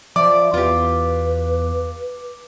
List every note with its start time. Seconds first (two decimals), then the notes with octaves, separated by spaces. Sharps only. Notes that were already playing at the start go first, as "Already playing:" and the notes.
0.16 F3 D5 E5 D6
0.54 E2 F4 G4 B4